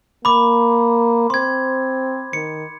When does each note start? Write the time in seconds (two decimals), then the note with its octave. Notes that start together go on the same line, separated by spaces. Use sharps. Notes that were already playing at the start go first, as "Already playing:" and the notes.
0.25 A#3 B5 D6
1.30 C4 C6 G#6
2.33 D#3 C#7